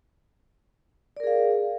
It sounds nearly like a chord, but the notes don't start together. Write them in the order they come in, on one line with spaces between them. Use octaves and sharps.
D5 A#4 G#4 F5